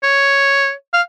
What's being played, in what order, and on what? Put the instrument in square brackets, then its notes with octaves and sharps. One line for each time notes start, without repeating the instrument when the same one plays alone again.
[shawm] C#5
F5